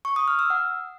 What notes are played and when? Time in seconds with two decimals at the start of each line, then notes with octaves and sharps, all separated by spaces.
0.05 C#6
0.16 D#6
0.28 F6
0.39 E6
0.50 F#5